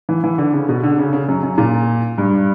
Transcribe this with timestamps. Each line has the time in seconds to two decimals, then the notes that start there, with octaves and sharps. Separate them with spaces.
0.09 E3
0.24 E3
0.38 D3
0.53 C#3
0.69 B2
0.84 D3
0.98 C#3
1.13 C#3
1.28 F#2
1.43 F#2
1.58 A#2
2.18 G2